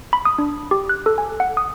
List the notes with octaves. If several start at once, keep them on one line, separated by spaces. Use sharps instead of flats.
B5
D#6
D4
G4
F#6
A4
G#5
F#5
D#6